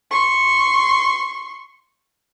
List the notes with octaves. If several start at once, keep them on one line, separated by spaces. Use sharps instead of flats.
C6 C#6